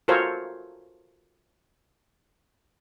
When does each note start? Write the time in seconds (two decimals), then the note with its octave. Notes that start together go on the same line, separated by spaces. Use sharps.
0.08 F4 F#4 A4 A#4 C5 C#5